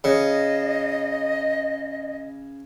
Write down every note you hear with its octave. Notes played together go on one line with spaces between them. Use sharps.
C#3 D#5